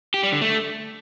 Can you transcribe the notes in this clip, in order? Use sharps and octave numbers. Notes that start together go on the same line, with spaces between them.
G4
G3
D3
A3